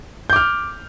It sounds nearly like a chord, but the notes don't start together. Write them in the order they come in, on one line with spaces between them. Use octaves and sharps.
G6 D6 F6